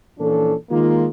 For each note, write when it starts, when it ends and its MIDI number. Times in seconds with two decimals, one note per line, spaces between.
0.19 0.54 46
0.19 0.54 52
0.19 0.54 53
0.19 0.54 61
0.19 0.54 62
0.19 0.54 69
0.71 1.07 51
0.71 1.07 56
0.71 1.07 58
0.71 1.07 65